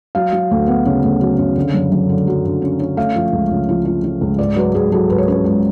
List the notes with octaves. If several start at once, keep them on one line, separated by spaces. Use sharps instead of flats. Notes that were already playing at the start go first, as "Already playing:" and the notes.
F#3 F5
F#3
D2
B3
C#3
D2
F#3
C#3
D3
F#2
F#2
D3
F#3
D3
C#4
C#4
A3 F5
F3
C#2
C#3
F3
F3
F3
C#2
G#2 D5
F#3 B4
G#2 G#4
F#3 A4
G#2 B4
C#5
C#4 B4
G#2